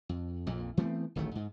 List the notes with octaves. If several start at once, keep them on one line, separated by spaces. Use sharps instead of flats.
F2
A#1 F2 A#2
E3 A3 B3 C4
D1 A1 D#3 A3
G#2